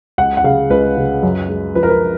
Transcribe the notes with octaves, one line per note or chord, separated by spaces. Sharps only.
C#2 F#5
F#5
C#3 F5
C#2 B4
C#3
F#2
G#3
F3 B4
A#4
B4